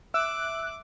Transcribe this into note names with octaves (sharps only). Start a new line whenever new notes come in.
E5 D6 E6 F#6